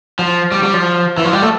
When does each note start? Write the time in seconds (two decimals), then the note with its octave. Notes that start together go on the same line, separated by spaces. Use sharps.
0.19 F3
0.52 G3
0.63 G3
0.74 F3
1.17 E3
1.25 F3
1.33 G3
1.42 A3